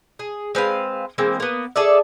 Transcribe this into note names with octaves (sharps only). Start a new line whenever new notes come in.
G#4
G#3 C4 B4 F5
E3 G#3 A#3 C4
A#3 B3
G#4 A4 D5 E5